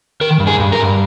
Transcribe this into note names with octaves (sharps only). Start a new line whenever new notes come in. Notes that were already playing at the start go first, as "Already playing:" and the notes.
D#3 A#4
G2
G#4
G2
A#4
G2